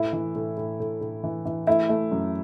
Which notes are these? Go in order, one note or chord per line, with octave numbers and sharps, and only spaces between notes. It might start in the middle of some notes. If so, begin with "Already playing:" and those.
Already playing: A2 E4
E3
A2
A2
A2
A2
E3
E3
A3 E4
A3
F#2